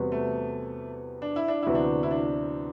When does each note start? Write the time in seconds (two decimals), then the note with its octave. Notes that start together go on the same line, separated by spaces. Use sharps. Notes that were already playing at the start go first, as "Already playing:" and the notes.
Already playing: E2 C3 G3 B3 F#4
0.12 A3
1.22 D4
1.36 E4
1.48 D4
1.63 D2 C3 E3 B3 E4 F#4
1.75 D4
2.03 E4
2.11 D4